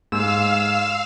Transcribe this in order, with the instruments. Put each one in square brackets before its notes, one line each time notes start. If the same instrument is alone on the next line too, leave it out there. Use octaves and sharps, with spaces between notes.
[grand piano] G#2 [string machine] F5 [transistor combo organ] E6